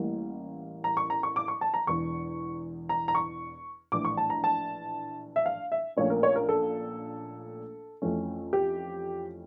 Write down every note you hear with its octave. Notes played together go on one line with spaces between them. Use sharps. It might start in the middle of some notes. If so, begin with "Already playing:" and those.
Already playing: A1 A2 G3 A#3
A#5
C#6
A#5
C#6
D6
C#6
A5
A#5
E1 E2 E3 C#6
A#5
A#5
C#6
A#1 A2 E3 D6
C#6
A5
A#5
A5
E5
F5
E5
A#1 A#2 A3 C#4 C#5
A#4
C#5
A#4
A4
F2 E3 A3 C#4
G4